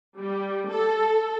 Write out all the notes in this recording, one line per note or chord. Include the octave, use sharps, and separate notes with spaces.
G3
A4